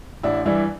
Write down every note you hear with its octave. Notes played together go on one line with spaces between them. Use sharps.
A1 D4 E4
G2 E3 D4 E4